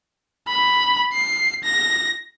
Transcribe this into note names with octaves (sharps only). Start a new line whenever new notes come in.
B5
C7
A#6